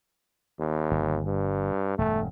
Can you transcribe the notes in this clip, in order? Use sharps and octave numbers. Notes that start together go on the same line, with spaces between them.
D#2
G1
G2
E1 G2 A3